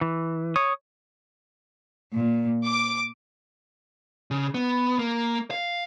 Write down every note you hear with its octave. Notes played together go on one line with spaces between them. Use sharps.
E3
C#5 D#6
A#2
D6
C#3
B3
A#3
F5